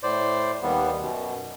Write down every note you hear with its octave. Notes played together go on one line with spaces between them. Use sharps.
A2 C5 D5
D#2 G3 B3
F#2 B2